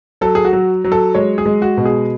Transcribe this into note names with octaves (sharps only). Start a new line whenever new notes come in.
F#3 A4
G#4
F#4
F#3
F#3
A4
G#3 C#5
G#4
G#3
F#4
B2
G#4